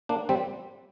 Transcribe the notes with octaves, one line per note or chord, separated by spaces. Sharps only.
A#3 D4
G3 C4